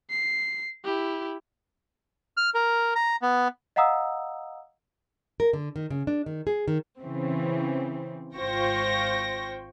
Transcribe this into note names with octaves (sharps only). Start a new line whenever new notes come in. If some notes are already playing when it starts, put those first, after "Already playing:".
C7
E4 G4
F6
A#4
A#5
B3
D#5 F5 F#5 A#5 D#6 E6
A#4
D3
D#3
C#3
D4
D#3
G#4
D#3
C#3 E3 C4
G#1 F4 C5 G5 C#6 A#6